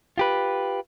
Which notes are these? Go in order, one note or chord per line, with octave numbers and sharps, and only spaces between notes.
F4 G4 B4